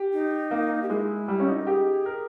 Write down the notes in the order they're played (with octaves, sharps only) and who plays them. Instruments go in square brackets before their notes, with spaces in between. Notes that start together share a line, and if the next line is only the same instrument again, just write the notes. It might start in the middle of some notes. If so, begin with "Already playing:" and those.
Already playing: [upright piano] G4
[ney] D#4
[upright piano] A#3
[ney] G4
[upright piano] G#3 [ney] E4
[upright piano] G3
C#4
D#4
[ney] A#4
[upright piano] G4 [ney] G#4
[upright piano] A#4